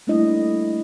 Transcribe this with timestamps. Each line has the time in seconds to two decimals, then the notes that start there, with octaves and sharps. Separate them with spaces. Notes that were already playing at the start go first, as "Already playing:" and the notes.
0.07 G3 A3 A#3 D4 E4 D#5